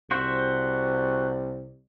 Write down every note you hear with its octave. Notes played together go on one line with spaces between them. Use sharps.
C2 F#4 C5 E5